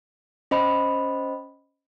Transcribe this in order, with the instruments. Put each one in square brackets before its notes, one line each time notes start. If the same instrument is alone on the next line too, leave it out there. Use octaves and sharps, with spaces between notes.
[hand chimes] C#4 C5 D#5 B5